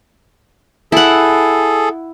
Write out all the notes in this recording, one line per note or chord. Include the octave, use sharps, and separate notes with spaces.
E4 G#4 A4 F#5